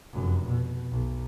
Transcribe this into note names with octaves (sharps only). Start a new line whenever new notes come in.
F1 F#2
B2
B1